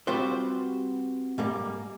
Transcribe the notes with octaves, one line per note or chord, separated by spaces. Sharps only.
G3 C4 F4 F#4 B4 C5
G#2 G3 A#3